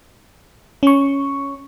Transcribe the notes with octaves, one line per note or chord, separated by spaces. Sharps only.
C#4 C#6